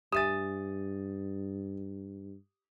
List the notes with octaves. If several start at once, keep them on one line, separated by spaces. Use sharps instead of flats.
G2 G4 E5 G#5 D#6 A6